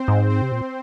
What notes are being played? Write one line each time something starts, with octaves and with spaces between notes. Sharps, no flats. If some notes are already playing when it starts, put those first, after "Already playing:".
Already playing: C4 C5
G#2
C4 C5
C3
A#2